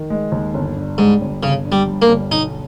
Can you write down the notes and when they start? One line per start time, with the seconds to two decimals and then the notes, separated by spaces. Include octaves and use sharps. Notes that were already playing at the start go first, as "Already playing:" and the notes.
Already playing: D#3
0.10 G#3
0.32 D#2
0.54 G1
0.76 G2
0.98 G#2 G3
1.21 G1
1.43 G1 C#3
1.65 G2
1.72 G3
1.87 G3
2.02 A#3
2.09 G1
2.31 B1 D#4